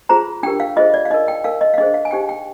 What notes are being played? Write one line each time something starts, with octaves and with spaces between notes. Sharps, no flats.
F4 G#4 C5 A#5
D4 G4 A#4 G5
F5
F4 G#4 C5 D#5
D5
F5
D#4 A#4 D#5
G5
D#4 A#4 F5
D#5
F5
D4 G#4 C5 D#5
F5
G#5
D#4 G4 C5 G5
G5